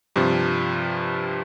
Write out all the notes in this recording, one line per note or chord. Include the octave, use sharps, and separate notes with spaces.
G2 C3 F3